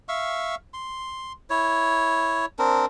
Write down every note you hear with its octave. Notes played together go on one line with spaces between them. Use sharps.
E5 F5 C#6
C6
E4 C#5
C4 D4 A#4